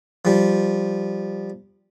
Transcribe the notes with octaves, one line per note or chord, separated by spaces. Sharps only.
F3 G3